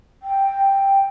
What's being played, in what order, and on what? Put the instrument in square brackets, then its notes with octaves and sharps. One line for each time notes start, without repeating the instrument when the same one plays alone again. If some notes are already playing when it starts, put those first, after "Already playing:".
[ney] G5